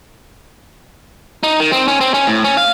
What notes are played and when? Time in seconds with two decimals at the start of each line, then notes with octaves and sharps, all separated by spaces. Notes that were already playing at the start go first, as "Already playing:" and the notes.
1.43 D#4
1.60 D#3
1.72 C4
1.88 C#4
2.01 C4
2.14 C#4
2.27 A2
2.44 C#4
2.57 F5